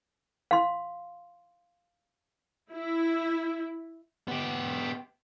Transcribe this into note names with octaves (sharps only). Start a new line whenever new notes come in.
F5 C6
E4
B3 G4